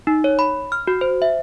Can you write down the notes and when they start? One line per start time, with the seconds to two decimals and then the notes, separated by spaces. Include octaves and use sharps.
0.07 D#4
0.24 C#5
0.39 B5
0.72 F6
0.87 F#4
1.01 C5
1.22 E5